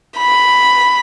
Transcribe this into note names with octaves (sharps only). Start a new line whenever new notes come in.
B5